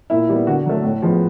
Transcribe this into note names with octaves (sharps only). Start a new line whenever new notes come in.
A#2 E4
G3 B3
D3 F#4
F#3 A3
A2
F3 G#3 B3